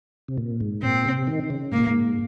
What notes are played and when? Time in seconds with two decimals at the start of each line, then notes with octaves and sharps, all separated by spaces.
0.28 C3
0.38 A#2
0.60 G#2
0.82 A#2 C4
1.06 C3
1.27 D#3
1.44 D#3
1.50 C#3
1.72 G#2 A#3
1.80 A#2
1.86 G#2